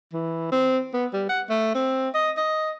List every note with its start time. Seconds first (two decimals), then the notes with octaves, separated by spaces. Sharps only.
0.13 E3
0.52 C4
0.94 B3
1.13 G3
1.29 F#5
1.50 A3
1.75 C4
2.15 D#5
2.37 D#5